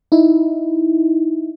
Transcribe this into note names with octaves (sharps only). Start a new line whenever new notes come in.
D#4 E4